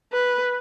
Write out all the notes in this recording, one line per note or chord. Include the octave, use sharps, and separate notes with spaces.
B4